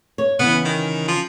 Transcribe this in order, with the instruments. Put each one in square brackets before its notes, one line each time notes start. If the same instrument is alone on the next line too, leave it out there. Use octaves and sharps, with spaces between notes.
[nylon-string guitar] C#5
[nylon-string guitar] C#3 E3 [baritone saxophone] B3
[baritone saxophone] D#3
F3